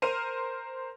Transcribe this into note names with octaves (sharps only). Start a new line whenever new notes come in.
A#4 C5 F6 D#7